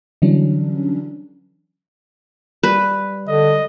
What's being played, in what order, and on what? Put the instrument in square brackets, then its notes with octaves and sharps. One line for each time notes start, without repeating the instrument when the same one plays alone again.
[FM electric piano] D3 E3 F#3 G3 C#4 D4
[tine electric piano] G3 [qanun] B4
[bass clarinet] D3 [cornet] D#5